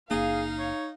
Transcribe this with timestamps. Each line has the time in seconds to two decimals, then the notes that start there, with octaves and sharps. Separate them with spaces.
0.11 F#1 A#3 D#4 G#4 F5
0.58 C#5